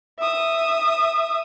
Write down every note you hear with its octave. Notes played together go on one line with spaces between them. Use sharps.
E5 D#6